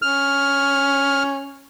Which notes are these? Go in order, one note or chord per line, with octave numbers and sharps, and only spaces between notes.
C#4 F6